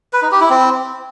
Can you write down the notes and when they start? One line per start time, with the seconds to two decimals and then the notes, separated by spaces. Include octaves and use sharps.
0.13 B4
0.22 D#4
0.32 G4
0.41 E4
0.50 C4